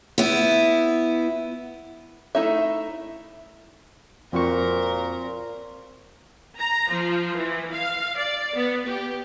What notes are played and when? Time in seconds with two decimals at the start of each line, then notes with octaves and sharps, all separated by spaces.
0.18 B3 E4
2.35 A3 D#4 E4 E5
4.33 F2 A#2 C4 F4 F#4 A#4 C5 C#6
6.58 A#5
6.89 F3
7.34 E3
7.71 F5
8.16 D5
8.55 B3
8.86 G4